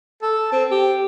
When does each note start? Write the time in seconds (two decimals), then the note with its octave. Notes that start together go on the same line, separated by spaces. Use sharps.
0.22 A4
0.52 C4
0.71 G4